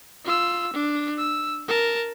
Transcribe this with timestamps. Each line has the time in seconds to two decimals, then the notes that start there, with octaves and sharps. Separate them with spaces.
0.25 F4 E6
0.73 D4
1.18 E6
1.68 A#4 A5